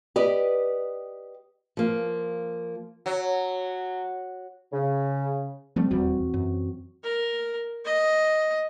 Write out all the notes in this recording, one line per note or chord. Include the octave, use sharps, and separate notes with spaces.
G4 B4 D5 D#5
F3 A#3
F#3
C#3
F3 G3 A3 C4
D#1 E2 E3 G3 F#4
F#2
A#4
D#5